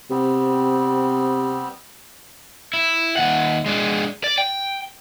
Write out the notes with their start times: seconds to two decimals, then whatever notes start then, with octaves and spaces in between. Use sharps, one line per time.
0.10 C3 G3 B3 C4
2.74 E4
3.17 D#2 F#5
3.66 G#3 D4
4.24 D5
4.38 G5